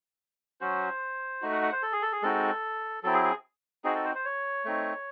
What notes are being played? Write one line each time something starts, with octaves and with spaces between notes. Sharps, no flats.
F#3 C#4 F#4 C5
A3 D#4 F#4
F#5
F#5
C5
A4
G#4
A4
G#4
G#3 C4 D#4 F#4 A4
F#3 C4 E4 A4
G#4
G#4
C4 D#4 F#4 G#4
A4
C5
C5
C#5
A3 C4 D#4